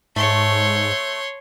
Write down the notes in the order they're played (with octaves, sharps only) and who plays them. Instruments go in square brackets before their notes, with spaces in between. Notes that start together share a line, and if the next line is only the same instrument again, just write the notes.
[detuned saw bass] G#2 [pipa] A3 [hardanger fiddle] C#5 C6